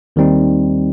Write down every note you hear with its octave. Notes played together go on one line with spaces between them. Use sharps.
D#2 D#3 G3 C4 D#4